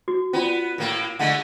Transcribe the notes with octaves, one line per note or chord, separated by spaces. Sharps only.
F#4
B3 C#4 F4 D5
A2 A#3
D3 G#3 A3 F#5